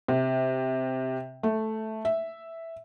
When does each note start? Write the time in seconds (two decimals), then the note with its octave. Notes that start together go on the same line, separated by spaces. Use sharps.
0.08 C3
1.43 A3
2.05 E5